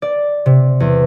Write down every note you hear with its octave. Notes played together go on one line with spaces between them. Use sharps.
D5
C3
E2